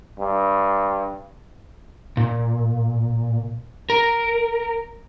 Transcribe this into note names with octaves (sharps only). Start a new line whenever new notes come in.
G2
A#2
A#4